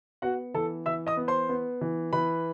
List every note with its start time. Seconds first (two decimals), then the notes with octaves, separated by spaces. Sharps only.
0.22 B3 F#4 F#5
0.54 E3 A4 A5
0.86 E3 E5 E6
1.07 D#5 D#6
1.17 B3
1.28 C5 C6
1.49 B3
1.81 E3
2.13 E3 B4 B5